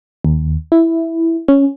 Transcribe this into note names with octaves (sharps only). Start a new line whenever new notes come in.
D#2
E4
C#4